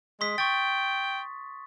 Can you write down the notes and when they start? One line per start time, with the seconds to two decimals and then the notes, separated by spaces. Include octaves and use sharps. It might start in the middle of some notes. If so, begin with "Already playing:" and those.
0.21 G#3 C6 D#6 B6
0.38 G5 C#6 A6